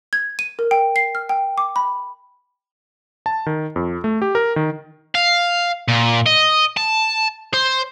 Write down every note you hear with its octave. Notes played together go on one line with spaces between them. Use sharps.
G#6
D#7
A#4
G5
C7
F6
G5
D6
B5
A5
D#3
F2
A3
G4
A#4
D#3
F5
A#2
D#5
A5
C5